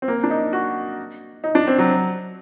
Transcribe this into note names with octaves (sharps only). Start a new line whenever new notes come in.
C4
A#3
D4
D#4
F#4
D#4
D4
C4
F#3